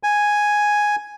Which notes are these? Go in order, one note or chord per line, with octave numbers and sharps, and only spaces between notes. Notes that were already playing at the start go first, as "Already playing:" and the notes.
G#5